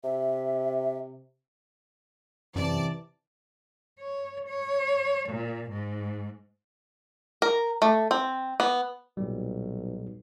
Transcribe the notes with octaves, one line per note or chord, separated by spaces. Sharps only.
C3 E5
F#2 C3 E3 D5 A5
C#5
C#5
A#2
G#2
A#4
A3
C4
B3
B1 A#2 G3